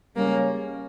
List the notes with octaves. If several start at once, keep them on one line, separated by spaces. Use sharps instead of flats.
C#3 G3 G#3 A#3 C#4